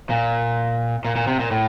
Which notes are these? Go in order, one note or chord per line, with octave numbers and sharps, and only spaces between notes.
A#2
A#2
A#2
C3
A#2
A2